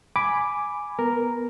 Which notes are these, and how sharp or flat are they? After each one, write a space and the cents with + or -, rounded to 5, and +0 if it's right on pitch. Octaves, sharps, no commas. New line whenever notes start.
G#5 +0 B5 +0 D6 +0
B3 -15 A#4 +0